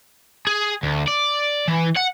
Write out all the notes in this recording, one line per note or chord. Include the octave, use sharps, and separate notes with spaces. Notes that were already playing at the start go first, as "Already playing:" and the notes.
G#4
D2
D5
E3
F#5